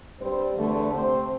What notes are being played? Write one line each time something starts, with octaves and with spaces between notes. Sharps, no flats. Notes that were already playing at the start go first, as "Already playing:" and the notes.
G2 G3 C4 C5
E2 D3 A3
C3 A3 C4 C5